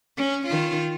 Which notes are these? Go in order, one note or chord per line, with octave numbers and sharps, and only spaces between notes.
C#4
D#3 F4